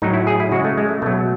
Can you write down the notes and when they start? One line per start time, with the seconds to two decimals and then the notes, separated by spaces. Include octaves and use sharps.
0.02 A2 F#3 D#4
0.14 E4
0.27 G#4
0.40 E4
0.52 C#3 G#3 F#4
0.65 A3
0.77 G#3
0.89 A3
1.02 B2 F#3 A3